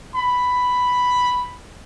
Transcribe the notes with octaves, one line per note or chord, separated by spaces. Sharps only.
B5